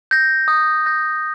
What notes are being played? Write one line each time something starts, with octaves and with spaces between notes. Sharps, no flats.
G6 A#6
D#6
G6 A#6